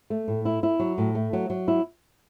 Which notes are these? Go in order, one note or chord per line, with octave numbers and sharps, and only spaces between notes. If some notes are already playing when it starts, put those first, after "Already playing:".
A3
A2
E4
E4
F#3
A2
A3
F#3
F#3
E4